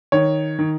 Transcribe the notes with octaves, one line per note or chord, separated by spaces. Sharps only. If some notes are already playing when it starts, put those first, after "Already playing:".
D#3 C#5
D#3